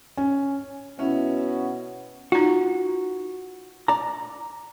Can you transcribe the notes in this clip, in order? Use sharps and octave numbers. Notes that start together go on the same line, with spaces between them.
C#4
B2 C#4 E4
D#4 F4 F#4
D5 A#5